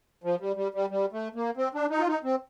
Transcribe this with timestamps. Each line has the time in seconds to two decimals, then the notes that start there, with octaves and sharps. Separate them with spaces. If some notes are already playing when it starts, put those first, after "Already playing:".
0.24 F3
0.40 G3
0.56 G3
0.74 G3
0.90 G3
1.13 A3
1.35 A#3
1.57 C4
1.74 D4
1.90 D#4
1.99 F4
2.07 D#4
2.24 C4